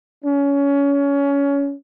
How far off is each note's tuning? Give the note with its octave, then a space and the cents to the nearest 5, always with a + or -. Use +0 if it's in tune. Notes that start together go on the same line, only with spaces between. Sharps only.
C#4 +20